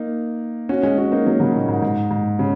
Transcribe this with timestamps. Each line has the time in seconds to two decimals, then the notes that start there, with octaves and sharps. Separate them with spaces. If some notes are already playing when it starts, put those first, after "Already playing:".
Already playing: A#3 D#4
0.69 C#4 F#4
0.83 G#3 C#4
0.98 C#4 F#4
1.12 A#3 D#4
1.26 F#3 A#3
1.40 C#3 F#3
1.54 A#2 D#3
1.68 G#2
1.82 G#2
2.11 G#2
2.39 C#3